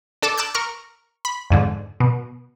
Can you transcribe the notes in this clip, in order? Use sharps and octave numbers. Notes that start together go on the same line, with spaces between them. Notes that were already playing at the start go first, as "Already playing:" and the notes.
D4 A4 A5 D6
A5 D6 E6 F#6 G6
A#4 A#5 C#6 F6
B5
F2 G#2 D3
B2